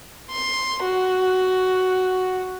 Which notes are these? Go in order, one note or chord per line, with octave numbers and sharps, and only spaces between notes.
C6
F#4